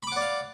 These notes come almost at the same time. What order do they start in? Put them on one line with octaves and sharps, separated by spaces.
B5 D6 F#5 D5 F5